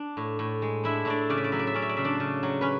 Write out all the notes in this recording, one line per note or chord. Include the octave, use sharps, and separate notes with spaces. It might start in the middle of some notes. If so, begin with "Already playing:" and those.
Already playing: D4
A2
A2
G#3
D4 E4 E5
A2 D4 D5
C#3 D5
E5
D5
F#3 E5
D5
E5
C#4 D5
E5
D5
C#3 E5
D4 D5
C#3
F#3
C#4 B4